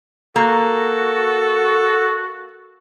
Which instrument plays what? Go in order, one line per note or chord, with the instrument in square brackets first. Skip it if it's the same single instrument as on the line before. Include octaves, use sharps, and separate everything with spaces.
[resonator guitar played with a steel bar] A#3 [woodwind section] F#4 [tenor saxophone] A4